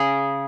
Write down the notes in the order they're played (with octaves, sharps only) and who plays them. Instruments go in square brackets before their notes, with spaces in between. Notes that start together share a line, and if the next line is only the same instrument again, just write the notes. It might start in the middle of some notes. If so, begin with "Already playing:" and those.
Already playing: [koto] C#3 G#4